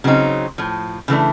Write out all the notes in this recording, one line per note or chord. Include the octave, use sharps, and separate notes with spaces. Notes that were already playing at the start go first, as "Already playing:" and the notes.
C#3 F#3 C4 D#4
A2 F3
C#3 E3 A3 D4